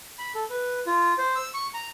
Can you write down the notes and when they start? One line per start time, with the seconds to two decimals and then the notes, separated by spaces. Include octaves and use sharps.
0.19 B5
0.35 A4
0.50 B4
0.86 F4
1.18 C5
1.36 E6
1.54 C#6
1.74 A#5